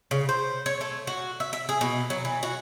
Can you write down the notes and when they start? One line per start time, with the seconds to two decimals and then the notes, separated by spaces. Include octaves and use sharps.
0.11 C#3
0.29 C5
0.66 C#5
0.81 A3
1.07 F#4
1.40 E5
1.53 E5
1.69 G#4
1.81 B2
2.10 F#3
2.25 E3
2.43 F#4